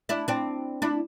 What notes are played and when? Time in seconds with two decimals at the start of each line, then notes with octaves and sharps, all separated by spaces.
0.09 D4 E4
0.28 C4 D4
0.82 D4 E4